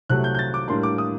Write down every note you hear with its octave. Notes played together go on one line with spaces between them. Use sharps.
C2 C3 F#3 A3 F#6
G6
G6
A6
D6
A2 G3 A#3 D4 C6
D6
D#6